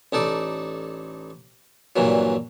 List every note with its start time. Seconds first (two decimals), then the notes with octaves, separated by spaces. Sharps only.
0.13 A1 D#4 A4 D5
1.96 G2 A#2 E3 F#3